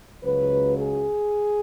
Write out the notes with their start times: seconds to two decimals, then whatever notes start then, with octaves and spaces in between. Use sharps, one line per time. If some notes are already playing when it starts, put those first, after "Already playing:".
0.24 C#2 C#3 F#3 B4
0.78 G#4